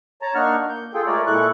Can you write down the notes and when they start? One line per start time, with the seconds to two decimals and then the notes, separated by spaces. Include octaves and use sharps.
0.22 C#5 A5 A#5
0.35 A#3 D4 D#4 F#5 C#6 F6
0.69 A#3 G6
0.94 F4 G#4 A4 G5
1.06 G#3 A3 F4 A#4 C#5 D5
1.27 A#2 G#3 E4 A4 C#6 F#6